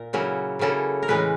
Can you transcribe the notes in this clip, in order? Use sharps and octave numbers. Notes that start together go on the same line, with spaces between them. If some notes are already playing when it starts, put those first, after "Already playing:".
Already playing: A#2 A#4
C#3 F#3 A#3 C#4 E4
C#3 F#3 A#3 C#4 E4 A4
A#4
A2 E3 G#3 C#4 B4